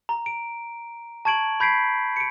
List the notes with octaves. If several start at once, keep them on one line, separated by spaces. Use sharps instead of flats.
A#5
D7
A5 C#6 G#6 D7 F#7
B5 G6 G#6 B6 C7 D7
C#7 D7